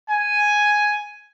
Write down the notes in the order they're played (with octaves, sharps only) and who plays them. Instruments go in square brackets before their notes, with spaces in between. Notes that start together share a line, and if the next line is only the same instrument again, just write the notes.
[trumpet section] G#5